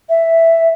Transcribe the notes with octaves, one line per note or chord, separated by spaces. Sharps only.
E5